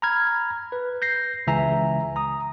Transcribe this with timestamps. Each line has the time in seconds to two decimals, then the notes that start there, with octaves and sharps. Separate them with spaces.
0.02 A#5 B5 F6 G#6
0.72 B4
1.02 G6 A#6 C7
1.47 C#2 C#3 E3 E5 G#5 A#5
2.16 A#5 D#6